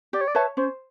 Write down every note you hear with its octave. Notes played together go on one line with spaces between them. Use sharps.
G4 D5
C#5
D5
B4 C#5 E5 A5
C#4 C5